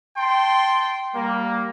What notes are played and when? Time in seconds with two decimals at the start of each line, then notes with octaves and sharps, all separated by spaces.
0.18 G5 A5 C6
1.15 G3 A#3